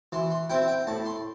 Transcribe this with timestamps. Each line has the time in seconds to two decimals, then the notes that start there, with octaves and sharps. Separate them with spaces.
0.12 E3 C6
0.30 C6
0.49 C4 E4 G5
0.68 G5
0.87 A2 A5
1.05 C6